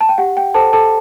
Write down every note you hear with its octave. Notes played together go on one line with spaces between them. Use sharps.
A5
G5
G4 F#5
G5
A4 C5 A5
A4 A5